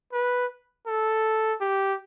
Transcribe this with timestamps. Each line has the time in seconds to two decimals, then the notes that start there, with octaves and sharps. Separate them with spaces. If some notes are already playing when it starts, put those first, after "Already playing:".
0.13 B4
0.87 A4
1.61 G4